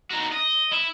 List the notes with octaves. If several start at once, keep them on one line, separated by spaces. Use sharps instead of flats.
D#4 F#4
D#5
E4